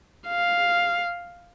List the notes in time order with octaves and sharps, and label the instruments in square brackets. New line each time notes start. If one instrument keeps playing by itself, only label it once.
[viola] F5